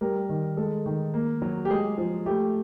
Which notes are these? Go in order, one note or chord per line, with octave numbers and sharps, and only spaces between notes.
G3 A#4
D#3
G#3 A4
D#3
A#3
F#3
G4
G#3 G#4
F3
A3 G4